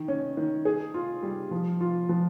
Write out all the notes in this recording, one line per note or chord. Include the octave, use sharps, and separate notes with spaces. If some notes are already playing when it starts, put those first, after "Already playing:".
Already playing: D#3
C#4
D#3
G#4
F4
G3
F3
F4
F3